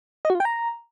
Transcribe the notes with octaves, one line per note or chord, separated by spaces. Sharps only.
D#5
F#4
F4
G5
A#5